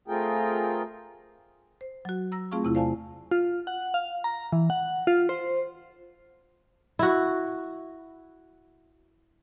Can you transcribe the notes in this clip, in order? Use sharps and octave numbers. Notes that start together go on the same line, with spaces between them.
A3 C4 F4 G#4 A#4 G5
C5
F#3 F#4
A#5 E6 A#6
A3 C4 F4 G#4 F5 C#6
E2 C3 E4 F4
C5 D5 F5 G#5 A5
F4
F#5
F5
A#5
E3
F#5
F4
C5
E4 F#4